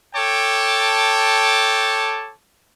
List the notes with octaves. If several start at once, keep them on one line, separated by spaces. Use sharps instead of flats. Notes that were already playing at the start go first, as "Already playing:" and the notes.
A4 C#5 G5 A5 D6